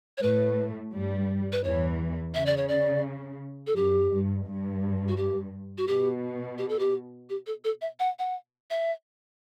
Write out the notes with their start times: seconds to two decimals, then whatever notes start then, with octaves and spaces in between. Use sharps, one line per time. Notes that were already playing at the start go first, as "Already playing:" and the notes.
0.17 C#5
0.22 A2 A3 B4
0.93 G2 G3
1.52 B4
1.64 E2 E3 C#5
2.34 C#3 E5
2.46 D5
2.57 C#5
2.68 D5
3.67 A4
3.76 F#2 G4
4.11 G2
4.46 G2
5.08 F#4
5.17 G4
5.78 F#4
5.87 B2 G4
6.58 G4
6.69 A4
6.79 G4
7.29 G4
7.46 A4
7.64 A4
7.81 E5
7.99 F#5
8.19 F#5
8.70 E5